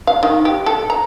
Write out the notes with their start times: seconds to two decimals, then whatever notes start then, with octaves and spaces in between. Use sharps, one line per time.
0.07 F5
0.23 D#3
0.45 G4
0.66 A4
0.90 A#5